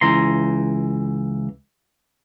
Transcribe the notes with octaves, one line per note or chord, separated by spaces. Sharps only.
C#2 E3 A#5 C6